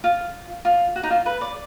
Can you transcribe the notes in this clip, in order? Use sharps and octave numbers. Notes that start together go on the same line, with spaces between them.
F4
F4
F#4
D#4
F4
B4
D5